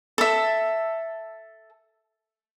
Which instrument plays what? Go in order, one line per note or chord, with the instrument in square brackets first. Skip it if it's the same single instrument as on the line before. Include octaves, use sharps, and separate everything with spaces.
[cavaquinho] A4 E5